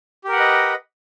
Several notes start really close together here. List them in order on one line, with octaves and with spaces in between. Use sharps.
G4 A#4 F#5 B4 D#5